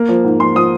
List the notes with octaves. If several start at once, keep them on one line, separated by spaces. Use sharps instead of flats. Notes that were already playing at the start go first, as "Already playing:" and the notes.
Already playing: A#3
F3
G#2
F3 C6
F3 D#6